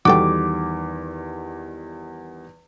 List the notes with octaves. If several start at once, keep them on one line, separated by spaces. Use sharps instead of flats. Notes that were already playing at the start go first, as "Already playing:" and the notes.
E2 D#3 G3 F#4 A4 G5 D6